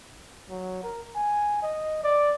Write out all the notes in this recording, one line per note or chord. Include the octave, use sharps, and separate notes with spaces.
F#3
A#4
G#5
D#5
D5